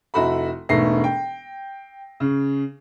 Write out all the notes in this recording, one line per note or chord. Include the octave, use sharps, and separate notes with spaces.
F1 E4 F#4 A4 B5
E1 G#2 B2 A3 A#6 C7
G5
C#3